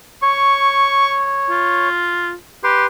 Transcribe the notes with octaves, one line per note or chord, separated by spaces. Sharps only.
C#5 C#6
F4
G4 B4 C6